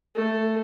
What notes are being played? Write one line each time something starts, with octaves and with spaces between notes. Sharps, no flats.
A3